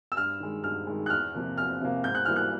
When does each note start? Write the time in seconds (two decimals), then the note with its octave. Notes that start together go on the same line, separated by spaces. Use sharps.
0.12 E6
0.17 G2 F6
0.40 D#3 G#3
0.63 G2 F6
0.87 D#3 G#3
1.06 F#6
1.10 E2 F6
1.34 C3 F3 A#3
1.57 E2 F6
1.81 C3 F3 A#3
2.04 G#2 G6
2.15 F#6
2.25 E3 G3 A#3 F6
2.36 F#6